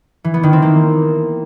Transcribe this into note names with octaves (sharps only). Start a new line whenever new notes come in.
E3
B3
D#3
C4
A#3